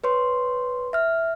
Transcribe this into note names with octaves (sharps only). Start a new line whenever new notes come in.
B4 C#5 C6
E5 F6